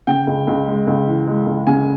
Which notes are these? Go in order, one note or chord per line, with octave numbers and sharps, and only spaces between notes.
C#3 G5
C#2
C#2
G#3
C#2
E3
G#3
C#2
C#3 G#5